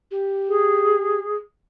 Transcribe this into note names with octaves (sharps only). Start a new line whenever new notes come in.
G4
G#4